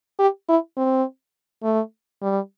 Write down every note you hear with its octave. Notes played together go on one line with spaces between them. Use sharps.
G4
E4
C4
A3
G3